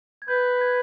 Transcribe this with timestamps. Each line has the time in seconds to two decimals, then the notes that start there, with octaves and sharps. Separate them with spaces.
0.22 G#6
0.28 B4 G6
0.61 G#6